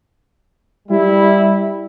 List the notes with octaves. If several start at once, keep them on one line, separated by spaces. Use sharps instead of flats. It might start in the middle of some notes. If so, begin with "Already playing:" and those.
G3 E4